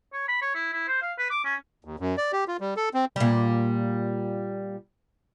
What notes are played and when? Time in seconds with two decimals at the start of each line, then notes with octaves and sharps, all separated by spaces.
0.13 C#5
0.28 B5
0.42 C#5
0.55 E4
0.73 E4
0.88 C5
1.02 F5
1.18 B4
1.31 D6
1.45 C#4
1.85 D#2
1.99 F#2
2.17 D5
2.33 G4
2.48 F4
2.60 G3
2.77 A4
2.94 C4
3.16 A#2 G3